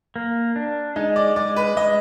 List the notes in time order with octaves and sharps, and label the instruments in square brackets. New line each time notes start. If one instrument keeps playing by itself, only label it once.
[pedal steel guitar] A#3
D4
[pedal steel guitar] G#3 [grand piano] D#4
[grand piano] D5
[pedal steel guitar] G#3 [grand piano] D5
[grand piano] B4
[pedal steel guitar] G#3 [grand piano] D#5